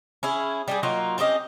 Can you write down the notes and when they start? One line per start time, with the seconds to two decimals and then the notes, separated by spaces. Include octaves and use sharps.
0.23 C#4 E4 G#4
0.68 G3 G4 G#4
0.83 F#3 A#3 D#4 F4
1.18 C4 C#4 G4 D#5